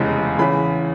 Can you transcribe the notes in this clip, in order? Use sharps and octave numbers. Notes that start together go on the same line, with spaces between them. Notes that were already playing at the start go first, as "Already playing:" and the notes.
Already playing: F1 E2 C#3 E3 G#3
E2 C#3 E3 B5